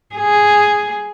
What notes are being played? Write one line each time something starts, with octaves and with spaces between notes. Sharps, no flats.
G#4